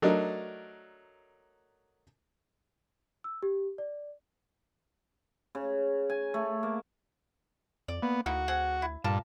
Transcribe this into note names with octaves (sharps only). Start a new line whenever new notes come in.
F#3 A3 D4 D#4 A#4
E6
G4
D5
C#3
G#5
A3
A#3
F2 D5
A#3 B3
D2 A#3 D#4 E4 F#4
C4 G#4 F#5
E4
G2 A#2 F4 A#4 A5